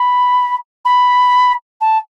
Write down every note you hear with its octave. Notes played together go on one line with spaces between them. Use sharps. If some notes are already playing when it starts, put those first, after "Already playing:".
Already playing: B5
B5
A5